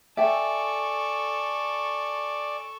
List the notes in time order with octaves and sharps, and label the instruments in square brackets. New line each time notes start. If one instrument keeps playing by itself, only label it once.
[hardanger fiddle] A4 C#6 [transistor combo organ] D5 [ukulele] E5 G5 [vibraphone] G#5